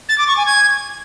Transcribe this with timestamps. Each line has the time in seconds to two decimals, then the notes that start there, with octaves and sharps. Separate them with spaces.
0.09 A6
0.18 D6
0.28 C#6
0.37 G#5
0.46 G#6